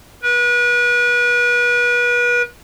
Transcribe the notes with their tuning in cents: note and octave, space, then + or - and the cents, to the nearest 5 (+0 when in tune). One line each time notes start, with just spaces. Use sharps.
B4 -35